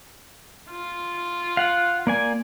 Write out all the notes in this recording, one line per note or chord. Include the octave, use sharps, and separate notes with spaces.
F4
F5 F#5
A#3 D5 G#5